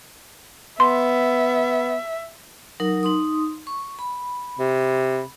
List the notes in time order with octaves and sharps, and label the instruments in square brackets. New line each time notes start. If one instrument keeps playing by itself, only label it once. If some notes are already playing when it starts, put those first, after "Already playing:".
[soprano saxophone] B3 [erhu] E5 [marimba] C6
[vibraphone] F#3 D#4 A#4
D#4 C6 D#6
C#6
B5
[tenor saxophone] C3